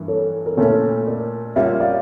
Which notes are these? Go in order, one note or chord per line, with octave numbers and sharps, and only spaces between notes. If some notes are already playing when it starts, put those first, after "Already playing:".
Already playing: G2 E3 A#3
A4 C#5
A#4
A#2 A3 C#4 E4 A4 C#5
A#4 D5
G3 A#3 C#4 F4 C#5 E5
D5 F5